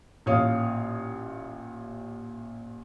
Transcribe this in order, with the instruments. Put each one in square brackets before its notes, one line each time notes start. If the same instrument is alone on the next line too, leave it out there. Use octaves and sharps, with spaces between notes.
[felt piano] A1 A#2 C#5 F5 D#6